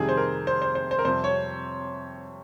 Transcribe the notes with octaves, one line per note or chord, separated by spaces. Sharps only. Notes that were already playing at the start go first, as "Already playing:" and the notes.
Already playing: F2 C3 D#3 G3 G#4
C5
A#4
C5
C5
C5
C5
A#4
F2 C3 G3 C5
C#5